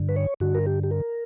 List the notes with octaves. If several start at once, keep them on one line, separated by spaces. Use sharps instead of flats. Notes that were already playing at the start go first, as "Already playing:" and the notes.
Already playing: G2 D3
B4
C#5
G2 D3 F#4
A#4
G4
G4
A#4